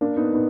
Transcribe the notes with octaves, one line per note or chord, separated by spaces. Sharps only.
A#3 D4
B3 D#4
B3 D#4